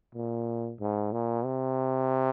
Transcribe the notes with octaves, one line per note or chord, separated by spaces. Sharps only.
A#2
G#2
A#2
C3